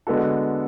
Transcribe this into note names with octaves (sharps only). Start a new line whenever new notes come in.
D3 G#3 B3 F#4 A4